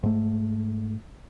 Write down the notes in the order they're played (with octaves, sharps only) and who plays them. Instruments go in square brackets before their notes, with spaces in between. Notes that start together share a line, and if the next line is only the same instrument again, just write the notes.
[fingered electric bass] G#2 A3